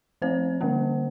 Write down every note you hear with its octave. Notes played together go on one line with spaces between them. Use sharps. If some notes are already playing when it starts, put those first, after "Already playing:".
F3 A3 C4 C5
D3 G3 A#3 C#4